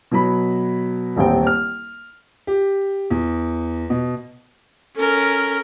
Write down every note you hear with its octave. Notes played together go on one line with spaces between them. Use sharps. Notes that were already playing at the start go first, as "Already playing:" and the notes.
B2 F#3 B5
D#1 A1 C4 G5
F6
G4
E2
B2
C#4 A4 A#4